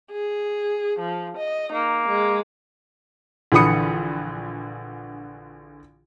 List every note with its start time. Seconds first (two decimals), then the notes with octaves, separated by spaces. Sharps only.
0.12 G#4
1.00 F3
1.38 D#5
1.73 A#3 D#4
2.08 G#3
3.52 A#1 D3 E3 B5 D#6 C#7